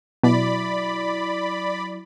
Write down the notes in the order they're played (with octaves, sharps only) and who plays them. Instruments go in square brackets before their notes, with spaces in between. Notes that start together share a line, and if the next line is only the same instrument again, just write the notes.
[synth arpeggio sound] B2 [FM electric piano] F#3 E4 [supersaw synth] D5 B5